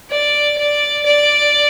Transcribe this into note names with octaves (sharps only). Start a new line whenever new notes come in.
D5
D5
D5